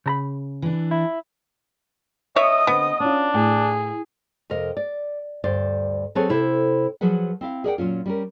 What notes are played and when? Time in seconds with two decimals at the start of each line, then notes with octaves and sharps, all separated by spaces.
0.06 C#3 A#5 B5
0.62 E3 D4
0.91 E4
2.36 C#5 D#5 E5 D#6
2.67 D3 B3 C4
3.00 C#4 D4 F4
3.34 A2 G#4
4.50 F2 C3 A#4 D#5
4.77 D5
5.44 D2 G2 C5 D5
6.15 F#3 C4 G#4 A4 B4 C#5
6.29 C3 E4 A4 C5
7.01 F3 F#3 G#4 B4 F#5
7.41 C4 E4 F5
7.64 G#4 A#4 D5 D#5 F#5 G5
7.78 A#2 F#3 C#4 F4
8.06 G3 C#4 A#4